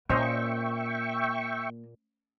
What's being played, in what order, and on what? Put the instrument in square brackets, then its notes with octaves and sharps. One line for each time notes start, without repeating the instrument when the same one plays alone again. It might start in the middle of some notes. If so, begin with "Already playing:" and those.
[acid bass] A#2 [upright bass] A#3 [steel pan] C#4 C5 D#5 [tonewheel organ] E5 G5 C#6